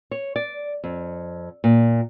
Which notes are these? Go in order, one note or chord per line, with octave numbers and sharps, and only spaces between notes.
C#5
D5
F2
A#2